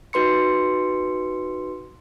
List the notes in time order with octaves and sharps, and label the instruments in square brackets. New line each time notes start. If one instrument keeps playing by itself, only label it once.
[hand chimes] D#4 F#4 B4 C6 C#7